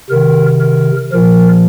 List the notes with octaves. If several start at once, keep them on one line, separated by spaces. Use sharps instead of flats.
C3 D#3 A#4
A#4
A#2 F3 A#4